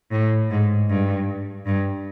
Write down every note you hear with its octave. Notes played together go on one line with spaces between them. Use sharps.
A2
G#2
G2
G2